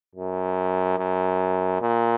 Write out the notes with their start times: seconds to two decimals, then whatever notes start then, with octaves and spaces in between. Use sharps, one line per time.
0.15 F#2
0.98 F#2
1.82 A#2